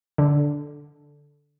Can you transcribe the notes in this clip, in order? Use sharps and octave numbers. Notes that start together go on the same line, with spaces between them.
D3